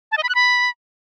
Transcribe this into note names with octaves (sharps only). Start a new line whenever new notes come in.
A5
D#5
B5
F#6
B5